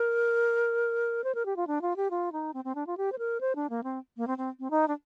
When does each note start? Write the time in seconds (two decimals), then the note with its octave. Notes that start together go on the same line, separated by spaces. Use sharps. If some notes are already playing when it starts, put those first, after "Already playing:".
Already playing: A#4
1.24 C5
1.35 A#4
1.46 G4
1.56 F4
1.67 D4
1.82 F4
1.96 G4
2.11 F4
2.32 D#4
2.54 C4
2.64 C4
2.75 D4
2.87 F4
2.97 G4
3.12 C5
3.18 A#4
3.41 C5
3.56 D4
3.70 A#3
3.83 C4
4.17 A#3
4.27 C4
4.38 C4
4.60 C4
4.71 D#4
4.88 D4